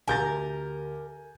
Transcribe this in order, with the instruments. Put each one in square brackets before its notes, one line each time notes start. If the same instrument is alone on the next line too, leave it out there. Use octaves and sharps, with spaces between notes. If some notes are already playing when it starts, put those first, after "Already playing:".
[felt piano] D2 G4 A#6 [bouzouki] A#4 [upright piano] G#5 G6 A6